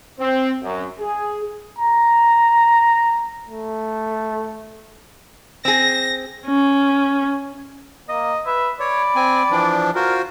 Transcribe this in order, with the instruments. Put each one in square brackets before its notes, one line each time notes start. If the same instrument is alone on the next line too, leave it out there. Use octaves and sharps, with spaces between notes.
[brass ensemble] C4
F#2
G#4
[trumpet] A#5
A3
[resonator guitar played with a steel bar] C4 G#4 [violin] A#6
[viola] C#4
[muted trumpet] A#3 [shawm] D#5
[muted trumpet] B4 [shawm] E5
[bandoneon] C#5 [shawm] D5 [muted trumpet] B5
[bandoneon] C4 G#5
E3 F3 D4
[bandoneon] F4 F#4 C5 [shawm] A#4